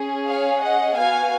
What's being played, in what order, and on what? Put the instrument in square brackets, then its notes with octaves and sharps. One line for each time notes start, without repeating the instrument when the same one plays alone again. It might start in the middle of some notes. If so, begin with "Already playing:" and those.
Already playing: [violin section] C#4 G#4
C#5 F5
D#5 F#5
B3 F#4 F5 G#5